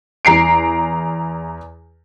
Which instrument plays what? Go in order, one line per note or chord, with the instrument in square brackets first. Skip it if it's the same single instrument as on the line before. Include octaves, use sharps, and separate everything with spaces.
[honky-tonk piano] E2 A#5 C7 D7